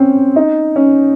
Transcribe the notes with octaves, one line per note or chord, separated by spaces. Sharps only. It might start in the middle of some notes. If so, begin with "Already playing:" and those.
Already playing: C4 C#4
D#4
C#4